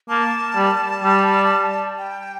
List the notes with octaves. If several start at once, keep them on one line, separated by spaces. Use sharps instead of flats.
A#3 A5
G3
G3
G5